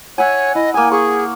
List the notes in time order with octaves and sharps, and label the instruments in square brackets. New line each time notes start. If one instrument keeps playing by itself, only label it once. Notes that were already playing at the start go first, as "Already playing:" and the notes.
[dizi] C#5 [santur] E5 F#5 G#5
[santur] E4 [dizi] D#5
[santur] A#3 D#6 [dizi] G#5
[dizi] G#4 [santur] C#6